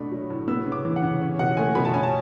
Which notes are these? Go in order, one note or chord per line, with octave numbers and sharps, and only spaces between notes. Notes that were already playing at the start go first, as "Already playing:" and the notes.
Already playing: B2 A3 D4 B5
F#3
A2
B3 E6
C#3
D6
E3
F#5
C#3
C#4
B2 F#5
A3 G#5
B2 B5
A5
C#4 G#5
A5